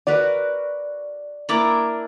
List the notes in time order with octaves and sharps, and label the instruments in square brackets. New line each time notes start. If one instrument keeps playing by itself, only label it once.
[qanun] F#4 A#4 B4 [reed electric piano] D5
[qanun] A#3 E4 A#4 [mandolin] D4 A#5 D6